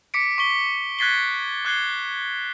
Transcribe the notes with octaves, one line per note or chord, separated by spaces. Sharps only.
D6 B6 C#7 D7
C#6 D6 B6 G7
F#6 G#6 A6 B6 C7 G7
D6 F#6 G#6 C7 G7